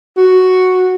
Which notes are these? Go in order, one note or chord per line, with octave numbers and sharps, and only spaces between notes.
F#4